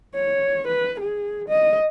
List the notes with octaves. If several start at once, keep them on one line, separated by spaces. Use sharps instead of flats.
C#5
B4
G#4
D#5